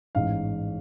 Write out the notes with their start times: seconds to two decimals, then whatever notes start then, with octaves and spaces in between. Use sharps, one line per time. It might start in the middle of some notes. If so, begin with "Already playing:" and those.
0.15 A1 G#2 F5